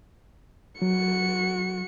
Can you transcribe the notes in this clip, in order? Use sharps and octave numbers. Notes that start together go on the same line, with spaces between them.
F#3 F#4 C#7